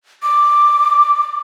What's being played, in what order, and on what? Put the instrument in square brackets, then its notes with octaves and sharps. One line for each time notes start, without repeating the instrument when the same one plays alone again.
[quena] D6